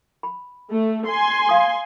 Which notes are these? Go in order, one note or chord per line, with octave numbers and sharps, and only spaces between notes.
B5
A3
G#5 C6
F5 D#6